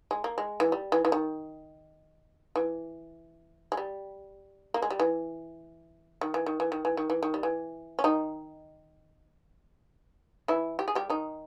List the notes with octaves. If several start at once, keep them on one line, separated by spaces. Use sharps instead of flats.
G#3
A#3
G#3
E3
G3
E3
E3
D#3
E3
G#3
G3
A#3
G#3
G3
E3
D#3
E3
D#3
E3
D#3
E3
D#3
E3
D#3
G3
E3
C#4
D#3 D#4
E3 E4
G4
G#4
G3 G4
D#3 D#4